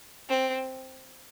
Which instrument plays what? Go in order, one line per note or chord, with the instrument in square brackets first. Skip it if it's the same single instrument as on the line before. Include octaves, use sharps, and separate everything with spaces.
[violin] C4